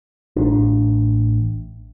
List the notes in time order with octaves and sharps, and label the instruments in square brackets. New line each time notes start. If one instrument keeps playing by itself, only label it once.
[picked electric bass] A1 D4